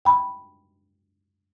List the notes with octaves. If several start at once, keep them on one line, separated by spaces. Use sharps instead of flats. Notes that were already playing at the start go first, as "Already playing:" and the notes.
G5 B5